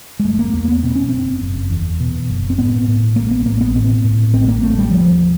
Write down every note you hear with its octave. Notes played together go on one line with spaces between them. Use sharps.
G#3
F#1 A3
A#3
E2 A#3
B3
B2 C4
C#4
F#1 C4
F#1
E2
B2
F#1
C4
A2 B3
A2
A1 A#3
B3
A1 A#3
B3
A2 C4
A2
A1 C4
A#3
A1 A3
G3
E1 F3